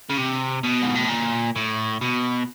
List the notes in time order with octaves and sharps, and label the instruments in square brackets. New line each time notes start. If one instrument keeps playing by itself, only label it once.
[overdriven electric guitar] C#3
C3
B2
G#2
A2
A#2
A2
B2